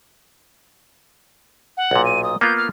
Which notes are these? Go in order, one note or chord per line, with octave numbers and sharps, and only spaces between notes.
F#5
B1 A#2
D#7
D#6
A#3 B3 F4 G6
F6